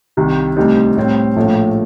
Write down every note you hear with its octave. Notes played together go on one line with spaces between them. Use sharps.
C2 C3 D#3
D2 C3 G3 C4 D#4
A2 G3 C4
A#1 A2 F3 A3